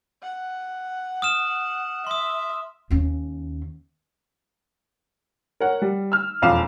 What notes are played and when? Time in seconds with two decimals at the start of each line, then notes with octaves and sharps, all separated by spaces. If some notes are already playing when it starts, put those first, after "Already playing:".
0.23 F#5
1.22 D#6 F6 E7
2.07 E5 C6 D#6
2.91 D#2 C#4
5.60 A#4 C#5 F#5
5.82 G3
6.12 E6 F6
6.42 E1 F2 F5 D6 E7